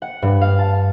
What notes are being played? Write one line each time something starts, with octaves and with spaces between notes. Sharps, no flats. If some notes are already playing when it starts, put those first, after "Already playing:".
F#5
G2
F5
A5